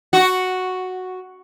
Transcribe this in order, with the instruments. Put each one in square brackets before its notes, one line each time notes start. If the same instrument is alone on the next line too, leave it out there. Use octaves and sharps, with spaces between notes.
[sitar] F#4